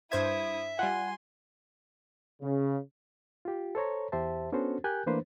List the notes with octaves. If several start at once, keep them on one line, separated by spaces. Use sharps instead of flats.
G2 E4 C5 E5 D#6 G#6
G3 F4 F#5 G#5 C6
C#3
F4 G4
A4 C5 C#5 A#5
E2 G4 C5 E5 A5
B3 C#4 D4 F#4 A4 C5
G4 A#4 G#5 F#6 G6
E3 A3 A#3 D4 B4 C5